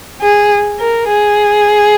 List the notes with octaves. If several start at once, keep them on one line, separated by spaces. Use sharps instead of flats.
G#4
A#4
G#4